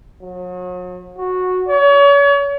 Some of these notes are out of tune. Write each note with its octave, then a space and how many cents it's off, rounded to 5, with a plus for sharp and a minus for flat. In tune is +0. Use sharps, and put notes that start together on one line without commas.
F#3 -40
F#4 -10
C#5 +35